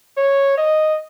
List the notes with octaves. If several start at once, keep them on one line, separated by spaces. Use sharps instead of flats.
C#5
D#5